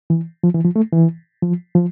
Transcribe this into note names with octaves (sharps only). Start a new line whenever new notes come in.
E3
F3
E3
F3
A3
E3
F3
F3